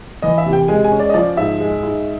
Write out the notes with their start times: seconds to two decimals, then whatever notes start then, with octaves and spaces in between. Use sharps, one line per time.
0.22 E3 D#5
0.38 E5
0.46 C3
0.53 G5
0.68 G#3 G#5
0.84 G#5
0.92 C#4
0.99 D5
1.09 D#5
1.14 F3 D5
1.37 G#2 E5
1.60 G#3
1.83 G#2